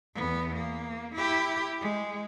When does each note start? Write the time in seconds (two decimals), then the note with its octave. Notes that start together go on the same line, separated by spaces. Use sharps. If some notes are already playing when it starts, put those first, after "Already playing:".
0.14 E2 B3
0.56 A#3
1.15 E4 G4
1.81 G#3